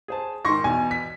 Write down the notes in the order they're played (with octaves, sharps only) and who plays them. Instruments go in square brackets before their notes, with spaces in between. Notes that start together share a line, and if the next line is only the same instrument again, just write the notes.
[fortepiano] G#4 C5 A5
[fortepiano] G#2 D#3 [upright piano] C6 C#6 A#6
[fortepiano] E2 B2 [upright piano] G#5
[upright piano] B6